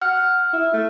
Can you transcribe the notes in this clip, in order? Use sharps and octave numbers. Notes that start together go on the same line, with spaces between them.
F#5 F6
E4
A3